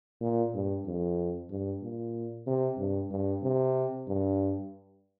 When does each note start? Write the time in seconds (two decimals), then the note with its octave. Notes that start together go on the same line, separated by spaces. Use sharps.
0.21 A#2
0.54 G2
0.86 F2
1.50 G2
1.83 A#2
2.47 C3
2.78 G2
3.11 G2
3.43 C3
4.08 G2